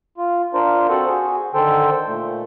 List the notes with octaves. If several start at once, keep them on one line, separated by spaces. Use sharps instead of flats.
F4
D4 F4 A#4 C5
C4 F#4 A4 C5 F#5
F#4 G#4
D3 D#3 A4 C5 G5
A#2 A3